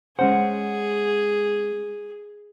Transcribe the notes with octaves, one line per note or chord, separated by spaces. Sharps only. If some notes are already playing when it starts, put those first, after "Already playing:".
G#3 C#4 G#4 C5 F#5